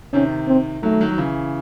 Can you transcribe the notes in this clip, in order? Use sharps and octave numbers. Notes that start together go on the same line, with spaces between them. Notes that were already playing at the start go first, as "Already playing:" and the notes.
C3 D#3 C#4
C4
D#3 F#3 A3
D#3 F#3
F#3
C#3 E3